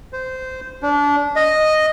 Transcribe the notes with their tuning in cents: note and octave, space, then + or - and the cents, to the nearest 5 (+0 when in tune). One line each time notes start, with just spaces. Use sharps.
C5 -15
D4 -25
D#5 -5